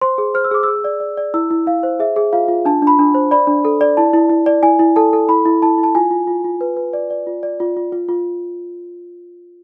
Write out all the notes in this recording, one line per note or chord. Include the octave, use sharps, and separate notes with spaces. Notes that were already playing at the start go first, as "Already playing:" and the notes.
C5 C6
G#4
C5 F6
E6
G#4 D6
G#4 E6
D5
D5
D5
E4 E6
E4
E4 F5
C5
G#4 E5
G#4
F4 F5
F4
D4 A5
D4
B5
D4
C5
D5 B5
D4
A4
D5
E4 A5
E4
E4
D5
E4 G#5
E4
A4 A5
A4
E4 B5
E4
E4 A5
E4
A5
F4 G#5
F4
F4
F4
B4
B4
D5
D5
F4
D5
F4
F4
F4
F4